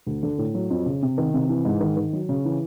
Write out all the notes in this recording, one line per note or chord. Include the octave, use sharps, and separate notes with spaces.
D2
D3
A2
F#3
F2
C#3
C3
D#3
C3
E3
G#2
D#3
D#3
F#3
C#3
E3